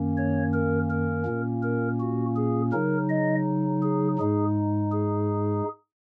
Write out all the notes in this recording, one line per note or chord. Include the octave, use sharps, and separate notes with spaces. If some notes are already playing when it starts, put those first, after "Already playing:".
Already playing: F#2 D#3 A#3 C#4
C#5
A#4
A#4
A#2 A#3 C#4
A#4
F#4
G#4
C#3 F#3 D#4 A#4
D#5
G#4
G#2 G#3 D#4 G#4
G#4